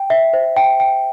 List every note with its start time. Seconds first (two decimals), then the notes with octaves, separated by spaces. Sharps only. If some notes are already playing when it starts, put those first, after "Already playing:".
Already playing: G5
0.10 E5
0.33 C5
0.57 G5
0.80 G5